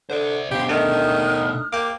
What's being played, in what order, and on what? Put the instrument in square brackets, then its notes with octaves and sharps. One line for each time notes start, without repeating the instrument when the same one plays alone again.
[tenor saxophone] D3 [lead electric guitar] C5 D5
[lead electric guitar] B2 D3 [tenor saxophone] G4 [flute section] C5 F5
[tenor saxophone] D#3 [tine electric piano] A3 D4 D#4 [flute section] D#6 F6 F#6
[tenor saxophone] A#3 [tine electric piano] G5 D6